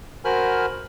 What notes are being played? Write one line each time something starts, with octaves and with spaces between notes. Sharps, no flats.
F#4 A#4 C5 G#5 B5 F6